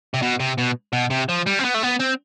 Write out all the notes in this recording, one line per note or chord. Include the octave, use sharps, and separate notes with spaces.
C3
B2
C3
B2
B2
C3
F3
G3
C4
B3
A3
B3
C4